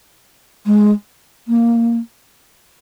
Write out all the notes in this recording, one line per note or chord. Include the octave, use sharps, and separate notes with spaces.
G#3
A#3